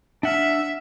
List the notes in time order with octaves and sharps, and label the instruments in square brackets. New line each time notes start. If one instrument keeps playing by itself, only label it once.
[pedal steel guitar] D4 F#5 F6 [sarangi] E5